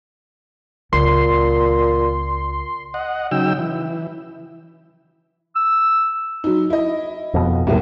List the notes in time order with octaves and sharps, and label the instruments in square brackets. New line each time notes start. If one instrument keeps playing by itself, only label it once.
[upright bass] C#2 [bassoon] A#2 [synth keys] C6
[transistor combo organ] D#5 F#5
C#3 F#3 D#4 G5 E6
E3
[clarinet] E6
[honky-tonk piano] F#3 D#4
E4 D#5
[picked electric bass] F2 B2
[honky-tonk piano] B1 G3 A#3 [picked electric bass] E2 A2